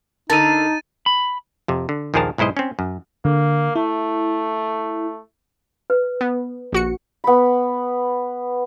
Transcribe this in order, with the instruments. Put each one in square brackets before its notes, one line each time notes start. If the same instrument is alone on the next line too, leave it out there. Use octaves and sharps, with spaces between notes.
[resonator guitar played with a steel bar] D3 A4 A#4 [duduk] D#4 [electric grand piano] A5 [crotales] A6 D#7
[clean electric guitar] B5
[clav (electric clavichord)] F2 C3
D3
A#1 D#2 F3 G#4 A#4 A5
B1 G#2 E4 C5 D#5
C4 C#4
F#2
[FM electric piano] D3 [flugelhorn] A#3
[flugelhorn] A3 [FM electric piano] E4
[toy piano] B4
[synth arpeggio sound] B3
A#1 F#4 C#7
[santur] B3 B5